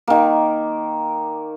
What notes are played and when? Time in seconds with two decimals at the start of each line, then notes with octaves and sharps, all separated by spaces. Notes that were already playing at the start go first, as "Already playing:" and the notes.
0.07 D#3 A#3